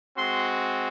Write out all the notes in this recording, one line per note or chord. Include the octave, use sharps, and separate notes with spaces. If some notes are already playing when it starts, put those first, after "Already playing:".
G#3 C4 F#4 C6